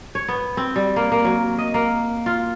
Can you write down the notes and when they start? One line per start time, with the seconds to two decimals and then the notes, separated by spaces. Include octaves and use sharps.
0.15 C#5
0.28 B3
0.57 C4
0.76 G3
0.96 A#3
1.12 A#3
1.25 F#3
1.58 D#5
1.74 A#3
2.26 F4